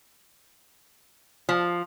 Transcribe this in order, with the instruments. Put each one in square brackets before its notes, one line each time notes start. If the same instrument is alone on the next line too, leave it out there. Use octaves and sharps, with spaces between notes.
[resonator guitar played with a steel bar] F3